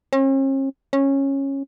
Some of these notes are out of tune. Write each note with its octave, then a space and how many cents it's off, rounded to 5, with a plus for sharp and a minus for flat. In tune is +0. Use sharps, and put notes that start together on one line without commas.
C#4 -45
C#4 -15